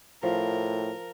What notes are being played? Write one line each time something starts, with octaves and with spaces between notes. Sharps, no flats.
A2 F3 A#4